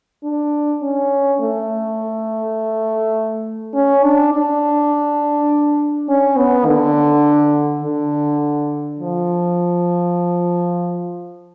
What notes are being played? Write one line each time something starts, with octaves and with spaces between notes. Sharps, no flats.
D4
C#4
A3
C#4
D4
D4
C#4
B3
D3
D3
F3